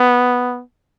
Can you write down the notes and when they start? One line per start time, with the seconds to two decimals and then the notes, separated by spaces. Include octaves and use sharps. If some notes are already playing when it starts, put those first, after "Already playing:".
Already playing: B3